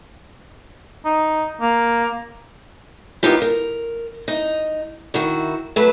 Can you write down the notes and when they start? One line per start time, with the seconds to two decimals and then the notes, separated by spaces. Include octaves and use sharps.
1.05 D#4
1.61 A#3
3.23 A#3 B3 D#4 F4 G4
3.42 A#4
4.28 D#4
5.14 D#3 E4 F#4
5.76 F#3 A3 B4